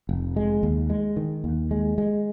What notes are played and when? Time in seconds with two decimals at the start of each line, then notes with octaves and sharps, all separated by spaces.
0.09 F1
0.36 G#3
0.63 D#2
0.90 G#3
1.16 D#3
1.44 D#2
1.71 G#3
1.98 G#3